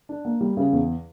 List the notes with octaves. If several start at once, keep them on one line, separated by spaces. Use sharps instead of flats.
D4
A#3
G3
C#3
E2